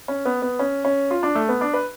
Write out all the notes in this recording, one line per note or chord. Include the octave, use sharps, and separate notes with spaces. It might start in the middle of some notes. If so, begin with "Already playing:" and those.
C#4
B3
B3
C#4
C#4
F4
D4
A3
B3
D4
B4